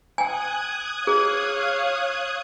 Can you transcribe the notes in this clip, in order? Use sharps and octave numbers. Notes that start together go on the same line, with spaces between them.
G5 G#5 D#6 F#6 G#6
G#4 C#5 F5